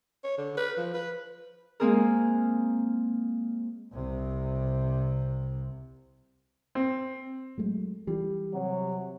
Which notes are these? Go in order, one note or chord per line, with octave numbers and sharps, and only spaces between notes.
C#5
D3
B4
F3
B4
G#3 A#3 C4 G#4 A#4
C2 C3
C4
F#3 G#3 A3
E3 G3
C3 F#3